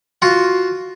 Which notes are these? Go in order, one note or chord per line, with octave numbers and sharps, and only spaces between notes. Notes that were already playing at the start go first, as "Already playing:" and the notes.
F4 F#4